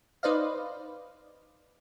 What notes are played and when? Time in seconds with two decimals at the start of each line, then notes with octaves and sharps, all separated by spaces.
0.23 D#4 B4 C5 D5 D#5 F5